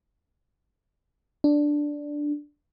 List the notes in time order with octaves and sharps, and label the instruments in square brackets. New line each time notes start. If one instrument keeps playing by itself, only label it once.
[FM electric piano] D4